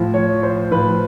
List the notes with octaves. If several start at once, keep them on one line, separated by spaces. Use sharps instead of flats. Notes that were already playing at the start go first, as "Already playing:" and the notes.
Already playing: A2 F3
C#5
C5
A2 F3 B4